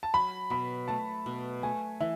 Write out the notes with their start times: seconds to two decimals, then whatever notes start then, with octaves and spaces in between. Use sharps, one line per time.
0.03 A5
0.14 F#3 B5
0.50 B2 B5
0.88 A3 A5
1.26 B2
1.63 A3 G#5
2.00 E3 E5